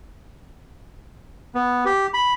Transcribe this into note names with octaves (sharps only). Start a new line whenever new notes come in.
B3
G4
B5